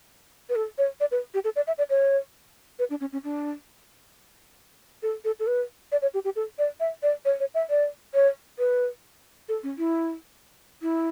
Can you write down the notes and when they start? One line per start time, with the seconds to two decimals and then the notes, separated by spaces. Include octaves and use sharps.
0.49 B4
0.56 A4
0.78 C#5
1.00 D5
1.11 B4
1.34 G4
1.44 A4
1.56 D5
1.67 E5
1.78 D5
1.90 C#5
2.79 B4
2.90 D4
3.01 C#4
3.13 C#4
3.24 D4
5.03 A4
5.25 A4
5.40 A4
5.47 B4
5.92 D5
6.02 C#5
6.14 G4
6.25 G4
6.36 A4
6.59 D5
6.80 E5
7.03 D5
7.25 C#5
7.40 C#5
7.54 E5
7.70 D5
8.14 C#5
8.59 B4
9.49 A4
9.63 C#4
9.78 E4
10.82 E4